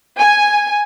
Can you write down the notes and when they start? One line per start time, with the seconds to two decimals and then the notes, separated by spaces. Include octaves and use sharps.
0.17 G#5